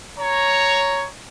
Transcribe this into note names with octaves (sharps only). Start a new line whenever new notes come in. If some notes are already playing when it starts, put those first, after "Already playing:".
C#5 A#5